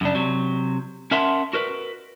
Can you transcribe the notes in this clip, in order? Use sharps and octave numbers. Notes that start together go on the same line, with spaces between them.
F#2 C#3 D4
C3 F#3
C#4 A#4 E5 F#5 A5 C6
F#4 A#4 B4